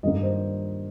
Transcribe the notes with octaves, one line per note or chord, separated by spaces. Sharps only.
G2 D#3 A#3 D#5
C5